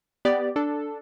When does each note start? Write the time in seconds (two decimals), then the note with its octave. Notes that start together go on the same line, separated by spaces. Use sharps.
0.25 B3 G4 D5
0.56 D4 A4